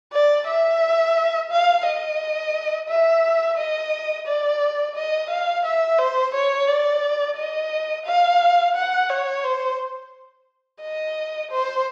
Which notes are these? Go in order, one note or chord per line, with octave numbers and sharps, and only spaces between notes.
D5
E5
F5
D#5
E5
D#5
D5
D#5
F5
E5
C5
C#5
D5
D#5
F5
F#5
C#5
C5
D#5
C5